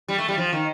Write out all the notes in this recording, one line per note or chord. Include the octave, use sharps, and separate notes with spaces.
G3
A3
G3
F3
D#3